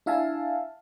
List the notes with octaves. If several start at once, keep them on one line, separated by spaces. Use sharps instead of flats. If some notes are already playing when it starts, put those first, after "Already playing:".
D4 E4 E5 F5 G#5 A5